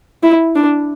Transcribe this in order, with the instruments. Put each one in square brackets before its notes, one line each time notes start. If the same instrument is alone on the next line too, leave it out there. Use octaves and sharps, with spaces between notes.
[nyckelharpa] E4
D4